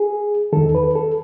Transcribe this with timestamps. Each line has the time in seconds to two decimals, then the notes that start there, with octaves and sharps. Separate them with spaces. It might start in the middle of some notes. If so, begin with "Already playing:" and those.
Already playing: G#4
0.53 E2 D#3 A4
0.75 B4
0.95 A4